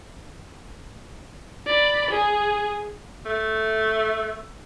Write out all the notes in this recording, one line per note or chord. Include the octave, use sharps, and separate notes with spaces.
D5 B5
G#4
A3